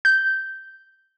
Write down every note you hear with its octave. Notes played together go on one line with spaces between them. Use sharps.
G6